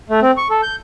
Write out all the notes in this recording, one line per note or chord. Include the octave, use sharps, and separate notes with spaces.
A3
C4
C#6
A4
G6